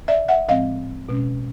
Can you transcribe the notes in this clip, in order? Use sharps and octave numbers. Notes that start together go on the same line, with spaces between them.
D5 E5
E5 F#5
A2 F3 G#3 C4 D#5 F5
B2 G#3 C#4